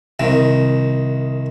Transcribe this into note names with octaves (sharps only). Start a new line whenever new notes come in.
C2 D#3